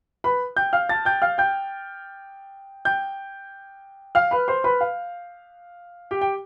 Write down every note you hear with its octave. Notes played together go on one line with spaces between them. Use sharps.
B4 B5
G5 G6
F5 F6
A5 A6
G5 G6
F5 F6
G5 G6
G5 G6
F5 F6
B4 B5
C5 C6
B4 B5
F5
G4 G5
G5